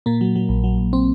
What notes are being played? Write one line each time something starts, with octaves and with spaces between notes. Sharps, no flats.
A#2 A#3
F#3
F#3
A#1
F#3
A#1
C4